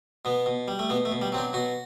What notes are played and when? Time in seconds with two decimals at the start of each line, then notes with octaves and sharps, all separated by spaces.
0.25 B2 B3
0.46 B2
0.68 G3
0.79 A3
0.90 B2 B3
1.05 A3
1.12 B2
1.22 G3
1.32 F#3 C4
1.38 D4
1.53 B2 F#4